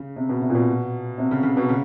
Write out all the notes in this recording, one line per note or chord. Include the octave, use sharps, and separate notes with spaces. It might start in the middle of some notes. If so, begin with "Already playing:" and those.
Already playing: C#3
C3
B2
C3
A#2
B2
C3
C#3
C#3
B2
C#3